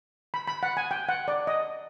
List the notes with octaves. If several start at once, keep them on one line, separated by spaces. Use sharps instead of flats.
B5
B5
F#5
G#5
G5
F#5
D5
D#5